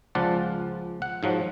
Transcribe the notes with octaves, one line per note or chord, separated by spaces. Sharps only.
C#2 F3 F4 D5 F#5 A5
F#5
G#2 F3 F#3